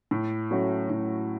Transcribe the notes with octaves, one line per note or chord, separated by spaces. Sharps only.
A2
F#3 A3 C#4 F#4
A2